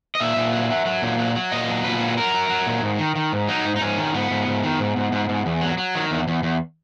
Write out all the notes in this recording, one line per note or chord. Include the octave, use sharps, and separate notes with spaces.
D#5
A#2 E5
A#2
F#3
F#3
F#3
A#2
F#3
F#3
A#2 D#5
F#3
A#2 B4
F#3
F#3 A#4
F#3
F#3
A#2
G#2
D#3
D#3
G#2
F#3 D#4
G#2
D#4
G#2 C#4
D#3
G#2 B3
G#2
G#2
D#3
G#2
G#2
G#2
G#2
E2
F#3
F#3
D#3
E2
E2
E2